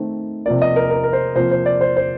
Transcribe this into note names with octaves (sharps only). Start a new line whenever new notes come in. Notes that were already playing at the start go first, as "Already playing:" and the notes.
Already playing: D#3 A3 C4
C3 F3 A#3 D5
D#5
A#4
A#4
A#4
C5
C3 F3 A#3 C5
C5
D5
C5
C5